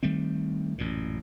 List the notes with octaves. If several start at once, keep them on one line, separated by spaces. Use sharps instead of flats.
D#3 G3 A3 C4
A1 F#2 A#2